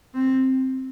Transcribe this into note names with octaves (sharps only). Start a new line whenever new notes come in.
C4